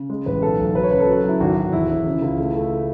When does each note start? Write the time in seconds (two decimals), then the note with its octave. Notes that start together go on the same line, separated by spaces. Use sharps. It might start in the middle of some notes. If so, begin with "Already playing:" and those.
Already playing: C#3
0.10 G#3
0.26 A1 B4
0.42 B1 A4
0.59 B1
0.75 F#3 B4
0.83 C#5
0.91 C#3 B4
1.00 A4
1.07 F#3
1.24 F#3 E4
1.40 G#1 F#4
1.57 G#1
1.72 E1 E4
1.89 E1
2.06 C#3
2.22 C#2
2.38 A3
2.55 A3